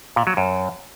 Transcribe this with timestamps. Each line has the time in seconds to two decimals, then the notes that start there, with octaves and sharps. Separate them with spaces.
0.16 A#2
0.27 F#3
0.37 F#2